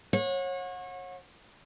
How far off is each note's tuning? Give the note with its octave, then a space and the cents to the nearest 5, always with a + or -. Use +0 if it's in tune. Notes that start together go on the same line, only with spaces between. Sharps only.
C#5 -30 F#5 -30